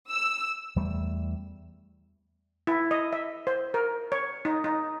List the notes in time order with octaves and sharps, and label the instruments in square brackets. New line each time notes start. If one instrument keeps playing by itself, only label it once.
[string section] E6
[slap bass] E2 G3 A3
[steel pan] E4
D#5
E5
C5
A#4
C#5
D#4
D#4